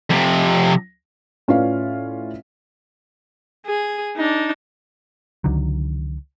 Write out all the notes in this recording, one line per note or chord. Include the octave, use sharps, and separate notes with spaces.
F2 C3
A2 C#4 F4 B4 D5 F5
G#4
D4 D#4
C#2 D3 D#3 F#3